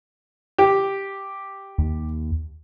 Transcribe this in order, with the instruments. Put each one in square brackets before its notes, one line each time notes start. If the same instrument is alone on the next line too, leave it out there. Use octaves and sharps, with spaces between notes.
[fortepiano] G4
[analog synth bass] D#2